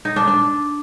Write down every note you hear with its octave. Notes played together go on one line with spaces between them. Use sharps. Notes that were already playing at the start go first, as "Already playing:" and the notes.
D#4
D4
D4